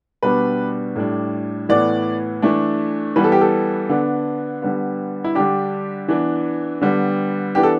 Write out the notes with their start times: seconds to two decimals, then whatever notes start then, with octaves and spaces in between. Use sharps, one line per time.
0.23 B2 G3 B3 D4 B4
0.96 A2 G3 D4
1.69 A2 E3 B3 D5
2.42 E3 A3 D4
3.16 E3 G3 B3 B4
3.24 A4
3.32 G4
3.41 A4
3.89 D3 B3 D4
4.62 D3 G3 B3
5.24 E4
5.35 D3 G3 D4 G4
6.08 E3 B3 D4
6.81 D3 G3 B3
7.55 E3 B3 D4 G4
7.63 A4